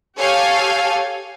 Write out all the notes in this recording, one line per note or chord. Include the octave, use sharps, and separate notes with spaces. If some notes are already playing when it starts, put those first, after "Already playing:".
G4 A4 C#5 F5 G#5